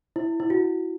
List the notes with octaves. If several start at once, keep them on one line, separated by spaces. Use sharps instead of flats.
E4
E4
F#4